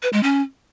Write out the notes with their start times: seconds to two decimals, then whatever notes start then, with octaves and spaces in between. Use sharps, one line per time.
0.03 B4
0.13 G#3
0.23 C#4